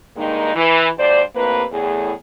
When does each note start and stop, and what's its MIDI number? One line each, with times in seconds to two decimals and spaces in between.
0.17 0.54 43
0.17 0.54 51
0.17 0.54 56
0.17 0.54 58
0.17 0.54 63
0.55 0.87 52
0.98 1.21 38
0.98 1.21 43
0.98 1.21 72
0.98 1.21 74
1.35 1.64 41
1.35 1.64 45
1.35 1.64 48
1.35 1.64 58
1.35 1.64 71
1.72 2.12 40
1.72 2.12 45
1.72 2.12 68